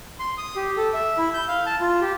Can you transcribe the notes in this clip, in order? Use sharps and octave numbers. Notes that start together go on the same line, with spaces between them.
C6
D#6
G4
A4
E5
E4
G6
F5
A5
F4
G4